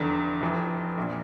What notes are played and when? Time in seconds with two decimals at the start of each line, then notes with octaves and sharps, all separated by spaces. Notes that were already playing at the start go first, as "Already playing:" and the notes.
Already playing: F1 E2 D3
0.41 F1 F2 E3
0.98 A#1 A#2